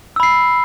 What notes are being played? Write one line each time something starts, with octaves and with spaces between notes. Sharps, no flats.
B5 E6 C7